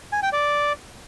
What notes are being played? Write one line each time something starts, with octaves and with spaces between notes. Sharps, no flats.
G#5
G5
D5